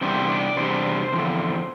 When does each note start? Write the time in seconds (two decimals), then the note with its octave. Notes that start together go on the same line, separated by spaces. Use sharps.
0.01 E2 C3 G3 D4 C5
0.29 D5
0.56 E2 C3 G3 D4 C5
1.12 E2 D3 F3 C4